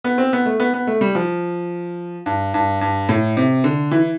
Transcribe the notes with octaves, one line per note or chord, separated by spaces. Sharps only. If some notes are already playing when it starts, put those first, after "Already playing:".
B3
C4
B3
A3
B3
B3
A3
G3
F3
G2
G2
G2
A2
C3
D3
E3